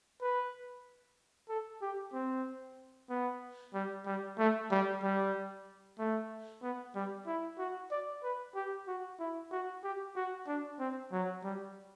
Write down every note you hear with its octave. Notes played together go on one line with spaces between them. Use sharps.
B4
A4
G4
C4
B3
G3
G3
A3
G3
G3
A3
B3
G3
E4
F#4
D5
B4
G4
F#4
E4
F#4
G4
F#4
D4
C4
F#3
G3